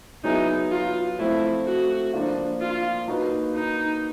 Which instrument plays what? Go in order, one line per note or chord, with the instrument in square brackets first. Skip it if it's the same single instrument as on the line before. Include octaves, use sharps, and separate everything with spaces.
[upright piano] F#3 B3 E4 G#4 [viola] D#4
[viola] F4
[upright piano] F3 A3 C4 [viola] E4
[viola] F#4
[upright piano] F3 A#3 D4 F4
[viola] F4
[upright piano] A#3 D#4 F#4 B4
[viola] D#4